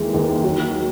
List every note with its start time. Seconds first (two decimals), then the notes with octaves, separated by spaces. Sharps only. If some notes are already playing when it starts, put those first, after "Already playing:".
Already playing: D#2 E3 G#3
0.14 D#2
0.44 F#3